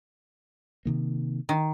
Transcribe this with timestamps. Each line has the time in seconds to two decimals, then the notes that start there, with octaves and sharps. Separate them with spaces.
0.85 C3 D#3 A#3
1.49 D#3